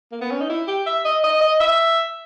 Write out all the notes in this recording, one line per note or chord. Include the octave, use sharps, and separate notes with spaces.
A#3
B3
C#4
D#4
E4
G4
E5
D#5
D#5
D#5
E5